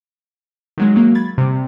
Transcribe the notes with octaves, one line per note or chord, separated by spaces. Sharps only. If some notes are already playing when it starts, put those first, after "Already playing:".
D#3 F#3 G#3
F#3 A#3
B5 G#6 A6
C3 G3